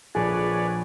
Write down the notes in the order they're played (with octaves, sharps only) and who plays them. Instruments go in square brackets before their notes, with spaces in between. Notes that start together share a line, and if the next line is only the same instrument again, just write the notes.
[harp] A#1 [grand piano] G#4 [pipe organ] B4 C#5 D5